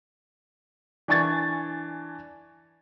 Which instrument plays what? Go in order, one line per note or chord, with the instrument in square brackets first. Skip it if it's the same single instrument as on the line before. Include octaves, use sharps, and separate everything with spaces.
[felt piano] E3 D4 G#5 C#6 G#6 A6